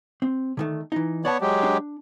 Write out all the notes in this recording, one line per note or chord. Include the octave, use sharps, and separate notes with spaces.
C4
D3 D#3 A3
E3 D#4
B3 C#5 D5 F#5 A5
F#3 G#3 G4
D4